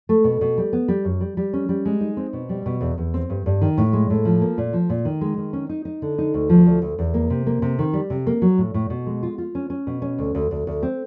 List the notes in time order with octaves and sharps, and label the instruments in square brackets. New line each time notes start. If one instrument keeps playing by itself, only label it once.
[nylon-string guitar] A3
B2
B2
G3
B3
G3
F#2
G3
G3
C#4
G3
G#3
D#4
C4
B2
G3
B2
E2
E2
C4
G2
G2
D#3
A2
G#3
A2
F3
A#3
A#2
F3
A#2
D#3
G#3
D#3
C#4
D#4
D#4
D3
D#4
D2
F3
D2
D2
E2
A#3
C3
A#3
C3
D#3
G3
C3
A#3
F#3
A2
A2
B2
G#3
F4
F4
C#4
C#4
B2
C#4
D2
D2
D2
D2
C4